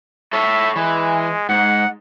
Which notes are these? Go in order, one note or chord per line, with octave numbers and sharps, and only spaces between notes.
A4 C#5 E5
E3 G#3
G#2 F#5